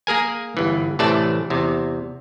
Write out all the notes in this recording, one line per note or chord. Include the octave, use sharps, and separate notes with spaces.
A#3 G#4 A#4 G#5
G1 E3
A1 C3 E3 A3 D5 A5
E2 C3